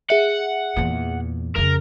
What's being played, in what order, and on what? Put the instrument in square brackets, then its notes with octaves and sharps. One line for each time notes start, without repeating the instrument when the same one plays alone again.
[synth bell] G#4 E5 [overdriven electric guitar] F#5
[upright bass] E2 A#2
[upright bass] F2 C#3 [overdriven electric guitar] A#4